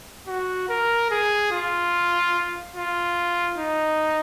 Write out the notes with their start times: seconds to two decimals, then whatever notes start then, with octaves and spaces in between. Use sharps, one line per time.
0.28 F#4
0.69 A#4
1.11 G#4
1.52 F4
2.76 F4
3.58 D#4